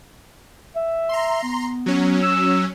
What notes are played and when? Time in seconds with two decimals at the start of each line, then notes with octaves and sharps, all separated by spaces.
0.76 E5
1.09 A#5 C6
1.43 B3
1.86 F#3 C#4
2.23 E6